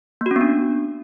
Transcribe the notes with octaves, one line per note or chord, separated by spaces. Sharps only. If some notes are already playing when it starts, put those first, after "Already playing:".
A#3 B3 C#4 D4 F#4